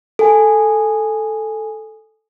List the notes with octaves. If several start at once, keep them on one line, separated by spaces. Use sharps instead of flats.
A4 G#5